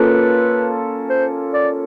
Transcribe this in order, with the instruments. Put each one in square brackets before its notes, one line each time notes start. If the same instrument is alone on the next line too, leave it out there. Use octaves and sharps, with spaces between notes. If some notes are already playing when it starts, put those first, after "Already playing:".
Already playing: [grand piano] A#3 C#4 F4 A4 [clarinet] B4
[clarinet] C5
D5